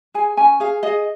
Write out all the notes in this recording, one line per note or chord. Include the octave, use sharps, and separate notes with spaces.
G#4 G#5
C#4 G#5
G#4 F5
G#4 D#5